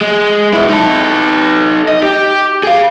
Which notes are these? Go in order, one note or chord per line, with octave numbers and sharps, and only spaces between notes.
G#3
B2 E4
D#4 A4
D#5
G4
G#4 F5